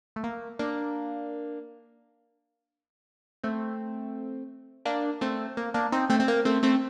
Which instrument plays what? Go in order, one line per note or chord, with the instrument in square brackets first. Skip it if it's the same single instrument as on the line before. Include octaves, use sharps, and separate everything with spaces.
[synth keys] A3
A#3
A#3 D4
A3 C4
A#3 D4
A3 C4
A#3
A#3 D4
C4 D#4
A3 C4
C4
A#3
A3 C4
A3 C4